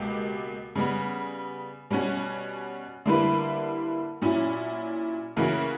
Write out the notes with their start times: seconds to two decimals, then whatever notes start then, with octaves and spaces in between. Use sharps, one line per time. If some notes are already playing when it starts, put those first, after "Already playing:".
Already playing: C#2 B2 A#3 G4
0.75 C#3 G3 B3
1.91 B2 G3 C#4 F#4 C#5
3.06 D3 G3 A#3 E4 B4
4.22 A#2 F#3 C#4 E4
5.36 C#3 E3 A#3 C#4 F#4